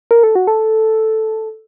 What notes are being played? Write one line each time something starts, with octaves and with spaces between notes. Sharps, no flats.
A#4
A4
F#4
A4